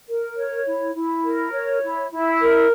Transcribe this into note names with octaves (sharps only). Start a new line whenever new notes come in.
A#4
C#5
E4
E4
A#4
C#5
E4
E4
A#4